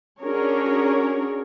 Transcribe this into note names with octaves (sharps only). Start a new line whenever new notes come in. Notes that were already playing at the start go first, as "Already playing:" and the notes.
C#4 D4 F#4 G#4 A#4 C#5